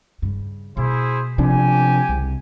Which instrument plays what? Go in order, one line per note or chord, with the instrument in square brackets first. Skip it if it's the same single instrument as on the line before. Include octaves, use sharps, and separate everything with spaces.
[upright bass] G2 C#3
[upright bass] B2 A#3 [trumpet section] E4 G#4 C5
[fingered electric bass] C3 F3 D4 [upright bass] B3 C4 [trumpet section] G4 G#5
[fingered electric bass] C2 [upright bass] C#3